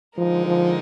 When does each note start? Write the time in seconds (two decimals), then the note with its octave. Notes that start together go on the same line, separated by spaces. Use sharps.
0.17 D3 F3 G#3 D#4 A#4
0.46 F3